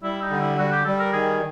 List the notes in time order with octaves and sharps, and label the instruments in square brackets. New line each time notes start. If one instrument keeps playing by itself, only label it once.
[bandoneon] G3 [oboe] E4
[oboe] D#4
[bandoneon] D3
[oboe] E4
[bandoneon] G3 [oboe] F#4
[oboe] G4
[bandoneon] G3 [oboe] A4
[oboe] A#4
[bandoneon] D#3 [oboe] G#4